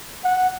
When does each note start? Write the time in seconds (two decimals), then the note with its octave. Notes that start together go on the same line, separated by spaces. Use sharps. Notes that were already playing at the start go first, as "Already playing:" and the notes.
0.24 F#5